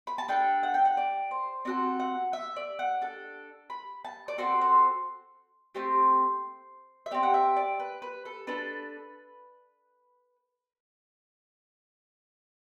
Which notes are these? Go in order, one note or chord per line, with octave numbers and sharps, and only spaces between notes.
B5
A5
D4 A4 G5
F#5
G5
F#5
D5
C5
C4 F#4 A4 D5
F#5
E5
D5
F#5
D4 A4
B5
A5
D5
C4 F#4 A4 C5
C5
A3 C4 G4 C5
E5
C4 G4 D5
F#5
E5
D5
B4
B4
A4
D4 A4 B4